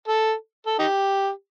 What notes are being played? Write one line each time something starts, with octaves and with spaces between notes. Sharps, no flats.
A4
A4
D#4 G4